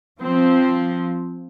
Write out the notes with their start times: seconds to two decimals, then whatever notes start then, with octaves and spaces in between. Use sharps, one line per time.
0.20 F3 C4